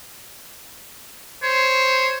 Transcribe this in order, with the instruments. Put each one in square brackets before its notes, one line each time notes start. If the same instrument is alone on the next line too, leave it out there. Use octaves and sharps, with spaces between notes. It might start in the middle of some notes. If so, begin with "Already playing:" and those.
[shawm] C5 [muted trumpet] C#5